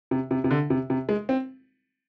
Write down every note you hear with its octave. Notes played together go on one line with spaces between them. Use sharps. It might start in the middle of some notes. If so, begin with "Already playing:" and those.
C3
C3
C3
D3
C3
C3
G#3
C4